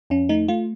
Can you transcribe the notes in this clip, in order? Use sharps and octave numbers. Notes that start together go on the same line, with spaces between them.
F2 C#4
A3 D#4
A3 F4